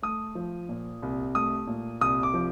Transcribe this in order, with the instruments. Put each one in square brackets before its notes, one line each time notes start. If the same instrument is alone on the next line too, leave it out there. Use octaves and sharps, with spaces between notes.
[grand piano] A3 D#6
F3
A#2
C2
A3 D#6
A#2
C2 D#6
D6
F3